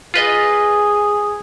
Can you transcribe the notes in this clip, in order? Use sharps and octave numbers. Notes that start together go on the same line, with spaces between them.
F4 G#4 B4 D#5